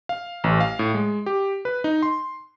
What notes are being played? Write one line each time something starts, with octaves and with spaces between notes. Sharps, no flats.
F5
A1
F5
A2
G#3
G4
B4
D#4
C6